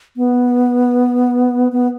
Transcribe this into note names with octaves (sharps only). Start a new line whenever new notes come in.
B3
B3